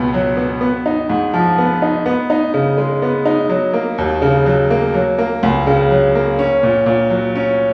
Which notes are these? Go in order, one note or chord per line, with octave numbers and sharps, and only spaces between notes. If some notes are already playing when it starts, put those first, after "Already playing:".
Already playing: C#2 B2 B3
F#3
B3
B3
D#4
G#2
F3
B3
D#4
B3
D#4
C#3
G#3
B3
D#4
F#3
A#3
D#2
C#3
F#3
A#3
F#3
A#3
C#2
C#3
F#3
A#3
C#4
A#2
A#2
F#3
C#4